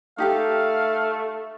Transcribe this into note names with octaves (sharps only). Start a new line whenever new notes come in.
A3 D#4 G4 A4 F5